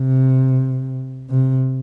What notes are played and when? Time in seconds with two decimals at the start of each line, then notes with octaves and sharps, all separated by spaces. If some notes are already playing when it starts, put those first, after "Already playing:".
Already playing: C3
1.30 C3